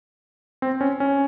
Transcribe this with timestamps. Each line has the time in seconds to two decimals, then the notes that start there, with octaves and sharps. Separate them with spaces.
0.62 C4
0.81 C#4
1.00 C#4